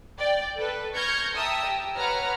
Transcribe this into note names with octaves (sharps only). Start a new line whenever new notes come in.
D5 G5
A4 B4
C#6 F6 G6 G#6 A#6 C#7
E5 G5 A5 A#5 D#6 E6
G4
B4 C#5 F#5 A#5 F6